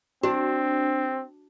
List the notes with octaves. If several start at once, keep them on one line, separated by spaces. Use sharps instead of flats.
C4 D4 F#4